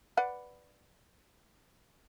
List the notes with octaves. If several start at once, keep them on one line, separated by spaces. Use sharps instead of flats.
B4 D5 F#5